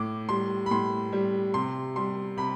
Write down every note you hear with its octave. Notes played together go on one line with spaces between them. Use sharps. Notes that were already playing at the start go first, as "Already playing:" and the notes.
Already playing: A2 D6
G3 C6
B5
A2 C6
G3
C3 C6
G3 C6
C3 B5